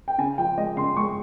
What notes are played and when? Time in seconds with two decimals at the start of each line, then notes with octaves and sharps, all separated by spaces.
0.08 G5
0.18 C#3 G#5
0.38 F3 G5
0.58 G#3 D#5
0.77 C#3 C6
0.96 G#3 C#6